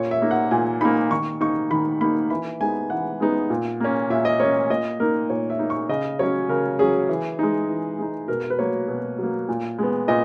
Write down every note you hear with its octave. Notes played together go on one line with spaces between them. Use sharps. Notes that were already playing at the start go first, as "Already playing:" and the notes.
Already playing: A#2 C#5
E5
A#3 D#4
F#5
A#2 G#5
A#3 D#4 B5
D#3 C#6
A#3 D#4 C#6
D#3 B5
A#3 D#4 B5
E3 B5
G#3 B3 D#4 G#5
E3 F#5
G#3 B3 D#4
A#2
A#3 C#4
A#2 E5
D#5
A#3 C#4 C#5
A#2 D#5
A#3 D#4 A#4
A#2 C#5
E5
A#3 D#4
C#6
C#3 D#5
F#3 C#4 C#5
C#3 A#4
F#3 C#4 G#4
E3
G#3 D#4
E3
G#3 D#4
B2 A#4
B4
F#3 A#3 C#5
B2
F#3 A#3
A#2
G#3 B3
A#2 D#5